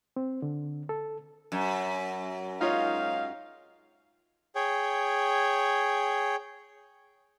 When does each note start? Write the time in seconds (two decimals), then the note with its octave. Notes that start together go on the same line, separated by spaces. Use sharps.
0.16 C4
0.42 D3
0.89 A4
1.52 F#2
2.61 G#2 D#4 F4 C#5 F5
4.55 G#4 C#5 G5